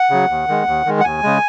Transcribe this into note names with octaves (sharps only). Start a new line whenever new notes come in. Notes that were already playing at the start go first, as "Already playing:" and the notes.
Already playing: F#5
C#3 F#3
D#2
D#3 G#3
D#2
D#3 G#3
F#5
D#2 G#5
C#3 G#3